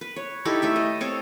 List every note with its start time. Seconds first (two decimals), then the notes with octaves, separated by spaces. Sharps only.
0.01 B4
0.16 C#5
0.45 D#4 E4 G4 A4
0.62 A3 A4 E5
0.76 D#5
1.01 C4 A4 C#5